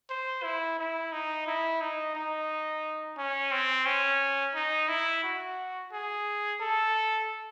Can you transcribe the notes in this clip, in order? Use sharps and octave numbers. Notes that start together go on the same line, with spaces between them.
C5
E4
E4
D#4
E4
D#4
D#4
C#4
C4
C#4
D#4
E4
F#4
G#4
A4